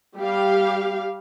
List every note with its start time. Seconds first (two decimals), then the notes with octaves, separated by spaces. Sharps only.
0.18 G3 G4 F5